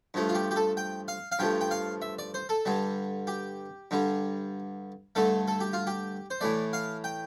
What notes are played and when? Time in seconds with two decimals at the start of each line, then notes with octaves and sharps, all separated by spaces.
0.14 G2 F3 A3
0.29 F4
0.35 G4
0.51 G4
0.56 A4
0.77 G5
1.08 F5
1.32 F5
1.39 G2 F3 A3 G5
1.61 G5
1.71 F5
2.02 E5
2.19 D5
2.34 C5
2.49 A4
2.66 G2 D3 G3
3.27 G4
3.91 G2 D3 G3
5.15 G2 D3 A3 A4
5.48 A4
5.60 G4
5.73 F4
5.87 G4
6.30 C5
6.41 A2 E3 A3 D5
6.73 F5
7.04 G5